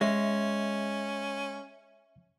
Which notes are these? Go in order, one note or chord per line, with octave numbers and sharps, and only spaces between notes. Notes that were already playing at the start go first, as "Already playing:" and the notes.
G#3 C#4 E5